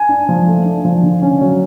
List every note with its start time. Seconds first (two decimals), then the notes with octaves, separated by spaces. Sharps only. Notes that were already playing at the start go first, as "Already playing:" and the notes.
Already playing: G#5
0.09 D4
0.29 F3
0.47 A3
0.65 D4
0.85 F3
1.03 D3
1.22 C#4
1.41 F#3